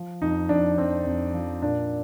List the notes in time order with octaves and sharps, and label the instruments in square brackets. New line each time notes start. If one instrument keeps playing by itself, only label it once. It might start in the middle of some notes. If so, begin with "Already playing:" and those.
Already playing: [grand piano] F3
F2 D#4
F2 D4
F2 C4
F2
F3
A#2 D4